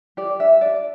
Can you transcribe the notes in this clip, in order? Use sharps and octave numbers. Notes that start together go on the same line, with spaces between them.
G4 D5
D4 E5
D4 D5